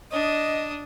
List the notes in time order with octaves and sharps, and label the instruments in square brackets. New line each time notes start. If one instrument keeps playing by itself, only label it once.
[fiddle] D4 D#6 [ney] D#5